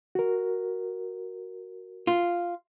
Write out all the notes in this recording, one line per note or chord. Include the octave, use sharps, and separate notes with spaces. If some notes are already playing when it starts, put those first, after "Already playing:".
F#4 A#4
F4